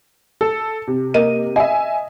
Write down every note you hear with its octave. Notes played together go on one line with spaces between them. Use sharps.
A4
C3
A#3 D#5 D#7
D#5 E5 G#5